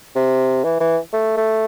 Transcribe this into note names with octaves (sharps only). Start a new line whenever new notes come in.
C3
E3
E3
A3
A3